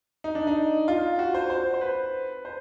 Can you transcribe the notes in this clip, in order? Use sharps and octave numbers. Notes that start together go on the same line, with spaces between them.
D#4
D4
D#4
F4
F#4
C5
C5
C5
B4
C5